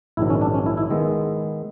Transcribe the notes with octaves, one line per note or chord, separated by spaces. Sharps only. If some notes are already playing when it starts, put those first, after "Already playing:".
A#1 G#2 D#3 F#3 E4
C#4
D4
C#4
E4
E4
D#3 G#3 B3